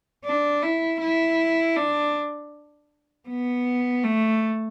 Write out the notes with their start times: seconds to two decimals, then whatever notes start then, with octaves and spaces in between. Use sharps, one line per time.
0.25 D4
0.62 E4
1.01 E4
1.76 D4
3.28 B3
4.04 A3